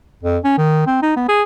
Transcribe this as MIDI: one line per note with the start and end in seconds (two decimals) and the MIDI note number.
0.23 0.38 41
0.44 0.55 61
0.58 0.85 51
0.87 1.00 60
1.02 1.16 63
1.17 1.25 59
1.29 1.44 68